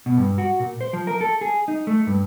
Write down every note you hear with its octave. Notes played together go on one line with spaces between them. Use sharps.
B2
G2
F#4
A#2
C5
F3
A#4
A4
G#4
D#4
A3
G2